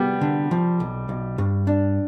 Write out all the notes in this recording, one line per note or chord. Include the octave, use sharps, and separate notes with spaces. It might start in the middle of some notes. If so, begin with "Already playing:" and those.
Already playing: G3 B3
D3
F3
B1
B1
G2
D4